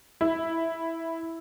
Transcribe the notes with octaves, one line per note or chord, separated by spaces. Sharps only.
E4